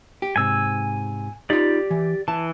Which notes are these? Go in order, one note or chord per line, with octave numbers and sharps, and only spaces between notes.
G4
G#2 C3 G#5 E6
D#4 F4 G4 D5
E3
E3 A5